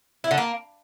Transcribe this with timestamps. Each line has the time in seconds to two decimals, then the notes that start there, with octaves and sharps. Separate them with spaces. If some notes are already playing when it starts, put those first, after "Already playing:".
0.24 E4
0.31 D3
0.38 A#3